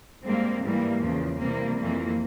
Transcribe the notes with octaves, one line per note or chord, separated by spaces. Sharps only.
G#2 G3 A#3 C4
G#2 E3 G3 A#3
E2 C#3 F3
C3 E3 G3 A#3 C4
F2 E3 A#3